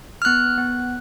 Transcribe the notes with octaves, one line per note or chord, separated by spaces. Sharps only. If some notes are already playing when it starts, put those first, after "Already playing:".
F6
B3 F#6
B3